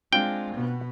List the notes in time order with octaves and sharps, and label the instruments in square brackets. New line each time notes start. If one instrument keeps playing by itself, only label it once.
[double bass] G#3 [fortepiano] C4 D4 F4 [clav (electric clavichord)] G5
[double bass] B2 B3